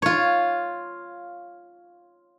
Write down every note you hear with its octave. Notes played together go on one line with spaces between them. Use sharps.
F4 C#5